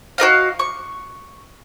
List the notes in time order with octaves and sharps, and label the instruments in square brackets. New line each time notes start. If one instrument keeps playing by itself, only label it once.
[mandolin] F#4 A#4 D#5 F5
C#6